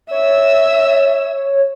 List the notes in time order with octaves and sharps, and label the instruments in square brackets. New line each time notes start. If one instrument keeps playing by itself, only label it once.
[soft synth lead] C#5 [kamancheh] E5 E6